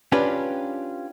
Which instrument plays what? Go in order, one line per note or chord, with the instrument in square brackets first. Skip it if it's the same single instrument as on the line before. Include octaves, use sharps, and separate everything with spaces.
[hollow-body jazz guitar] C#4 D4 F4 G4 B4